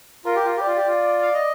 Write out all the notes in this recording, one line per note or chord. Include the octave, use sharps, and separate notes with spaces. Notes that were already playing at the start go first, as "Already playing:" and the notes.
F4 A#4
G4
F4
G4 D5
F4
G4
F4
F5
D#5